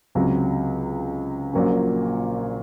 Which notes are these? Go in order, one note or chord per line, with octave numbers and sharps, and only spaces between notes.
C#2 C3 F#3
A#1 A#2 F#3 A#3 C#4